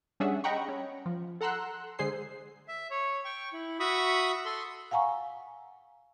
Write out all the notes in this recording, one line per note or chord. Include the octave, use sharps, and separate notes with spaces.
G3 C#4 D4 G#4 E5 F#5
D#5 F#5 G5 A#5 B5 C#6
C#4
F3
A4 F#5 A#5 C6 E6 F#6
D3 G#3 G#4 C5 C7
E5
C#5
G5 C#6
E4
F#4 E5 B5 C#6 D#6
A4 C6
F5 F#5 G#5 A#5 C#6